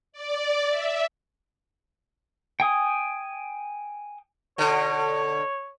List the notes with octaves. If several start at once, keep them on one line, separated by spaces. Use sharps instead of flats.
D5
E5
G5 G#5 D#6
B2 D3 C#5